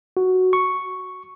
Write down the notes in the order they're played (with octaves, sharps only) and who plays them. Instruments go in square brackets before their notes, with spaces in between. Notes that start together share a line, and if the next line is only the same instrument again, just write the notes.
[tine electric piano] F#4
C#6